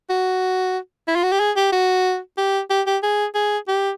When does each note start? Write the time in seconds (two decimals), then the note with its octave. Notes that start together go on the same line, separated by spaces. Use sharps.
0.10 F#4
1.07 E4
1.15 F4
1.23 F#4
1.32 G4
1.40 G#4
1.56 G4
1.72 F#4
2.37 G4
2.70 G4
2.86 G4
3.03 G#4
3.35 G#4
3.68 G4